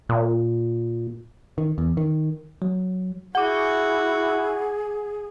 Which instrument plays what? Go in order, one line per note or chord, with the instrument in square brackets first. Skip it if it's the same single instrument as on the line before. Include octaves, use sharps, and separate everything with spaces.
[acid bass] A#2
[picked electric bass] D#3
E2
D#3
[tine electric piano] F#3
[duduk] E4 [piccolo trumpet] F#4 [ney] G#4 [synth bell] F#5 D6